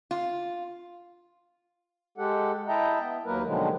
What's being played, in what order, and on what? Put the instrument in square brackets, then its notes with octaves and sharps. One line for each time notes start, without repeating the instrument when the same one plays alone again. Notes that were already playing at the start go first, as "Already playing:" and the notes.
[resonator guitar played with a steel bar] F4
[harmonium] G#3 G4 A4 F#5
E4 D#5 E5 G5 A5 A#5
B3
D#2 F#3 A#3 A#4 B4
B2 D3 D#3 F3 F#3 G#3